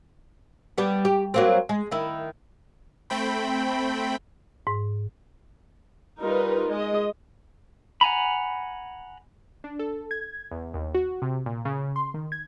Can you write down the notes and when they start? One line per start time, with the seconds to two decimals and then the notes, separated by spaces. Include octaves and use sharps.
0.78 G3 B3
1.05 G4
1.34 F#3 A#3 C4
1.69 G#3
1.91 D#3 E4
3.10 A3 C4 G5 B5
4.67 G#2
6.21 G3 D#4 F4 A#4 B4
6.69 G#3 D#5
8.01 F#5 G#5 A#5 B5
9.64 D4
9.79 A4
10.11 G#6
10.51 E2
10.74 D#2
10.95 F#4
11.22 C3
11.46 A#2
11.65 C#3
11.96 C6
12.14 D#3
12.32 G#6